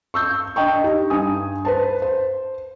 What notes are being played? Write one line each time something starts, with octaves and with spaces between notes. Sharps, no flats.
C#6 E6 G6
D4 D#5 G5 C#6
D#4 G4
G2 G#5 D#6
B4 C5 A5
C5